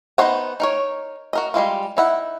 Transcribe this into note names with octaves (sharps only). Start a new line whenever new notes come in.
B3 D#4 C5 C#5 F#5
D#4 A#4 C#5
F#4 A#4 D#5
G3 G#3 E4 F4
D#4 E4 F#5